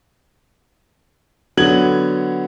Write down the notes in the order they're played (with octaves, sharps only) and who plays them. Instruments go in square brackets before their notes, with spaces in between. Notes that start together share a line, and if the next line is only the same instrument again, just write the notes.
[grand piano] D3 F#3 B3 G#6 F#7